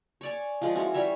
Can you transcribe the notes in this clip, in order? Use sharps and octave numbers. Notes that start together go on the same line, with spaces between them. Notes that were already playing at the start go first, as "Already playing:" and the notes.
C#5 D5 G#5
F3 G#3
E3 C#4 F#4
G3 C#5 E5